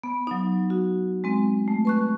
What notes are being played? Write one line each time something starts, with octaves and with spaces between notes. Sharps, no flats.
B3
F#3 D#4
F#4
G#3 C4
A3
B4 C#6 F#6